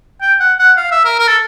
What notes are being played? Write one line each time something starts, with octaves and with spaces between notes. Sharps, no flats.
G5
F#5
F#5
F5
E5
A#4
A#4
A4